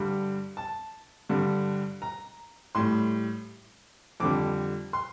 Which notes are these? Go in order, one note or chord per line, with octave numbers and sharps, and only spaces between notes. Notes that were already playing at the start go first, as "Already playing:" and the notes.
Already playing: G2 D3 G3
A5
G2 D3 G3
A#5
A2 G3 C6
F2 D3 G3 D6
C6